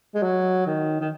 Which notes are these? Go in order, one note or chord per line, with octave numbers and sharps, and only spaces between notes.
G#3
F#3
D#3
D#3